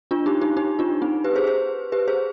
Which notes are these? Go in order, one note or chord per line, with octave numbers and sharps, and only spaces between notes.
D4 F4
D#4 G4
D#4 G4
D#4 G4
D4 F4
C4 D#4
G4 B4
G#4 C5
G#4 C5
G4 B4
G#4 C5